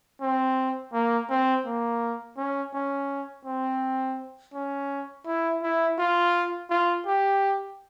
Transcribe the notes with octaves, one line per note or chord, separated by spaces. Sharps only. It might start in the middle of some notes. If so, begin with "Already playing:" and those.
C4
A#3
C4
A#3
C#4
C#4
C4
C#4
E4
E4
F4
F4
G4